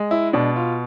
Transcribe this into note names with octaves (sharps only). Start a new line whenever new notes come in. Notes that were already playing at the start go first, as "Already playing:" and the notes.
Already playing: G#3
E4
B2 D4
F4